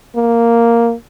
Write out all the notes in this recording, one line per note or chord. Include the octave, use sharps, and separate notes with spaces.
A#3